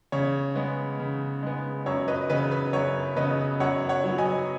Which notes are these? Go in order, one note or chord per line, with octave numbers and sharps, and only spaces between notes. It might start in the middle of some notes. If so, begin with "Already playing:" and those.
C#3 C#5
G#3 B3
C#3
G#3 B3
F#2 C#5
B4 D#5
C#3 B3 B4 D#5
B4
F#2 C#5
C#3 B3 B4 D#5
F#2 C#5 F#5
C#5 F#5
F#3 B3
D#5 G#5